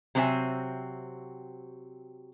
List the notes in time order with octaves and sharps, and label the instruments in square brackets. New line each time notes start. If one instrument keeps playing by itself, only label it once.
[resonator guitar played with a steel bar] C3 F#3 C4 E4 E5 G#5